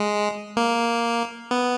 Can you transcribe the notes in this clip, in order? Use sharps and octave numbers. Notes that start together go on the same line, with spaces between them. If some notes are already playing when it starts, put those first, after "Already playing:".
Already playing: G#3
A#3
B3